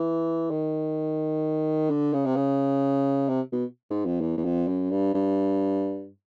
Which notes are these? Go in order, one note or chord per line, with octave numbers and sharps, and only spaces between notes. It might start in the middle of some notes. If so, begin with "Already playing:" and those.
Already playing: E3
D#3
D3
C#3
C3
C#3
C3
B2
G#2
F2
E2
E2
F2
F#2
G2
G2